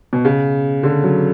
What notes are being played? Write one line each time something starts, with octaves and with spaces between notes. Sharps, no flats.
B2
C#3
D3
F#3